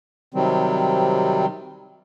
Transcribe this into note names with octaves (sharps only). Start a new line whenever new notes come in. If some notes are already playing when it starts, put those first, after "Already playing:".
C3 D#3 F#3 G3 C4